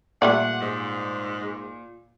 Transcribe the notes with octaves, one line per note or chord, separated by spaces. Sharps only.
A#2 G3 A3 D5 F#5
G#2